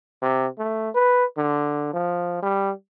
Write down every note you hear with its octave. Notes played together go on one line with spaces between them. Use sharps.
C3
A3
B4
D3
F3
G3